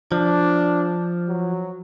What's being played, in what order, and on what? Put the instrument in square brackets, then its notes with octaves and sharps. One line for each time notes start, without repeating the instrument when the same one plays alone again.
[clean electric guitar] F3 [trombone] D4
[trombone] F#3